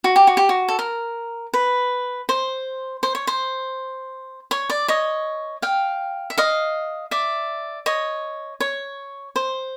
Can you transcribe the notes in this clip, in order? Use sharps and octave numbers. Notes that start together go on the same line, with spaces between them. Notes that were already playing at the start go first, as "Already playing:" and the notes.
F#4
G4
F#4
G4
F#4
A4
A#4
B4
C5
C5
C#5
C5
C#5
D5
C#5 D#5
F5 G5
E5
D#5 F5
D5 E5
C#5 D#5
C#5
C5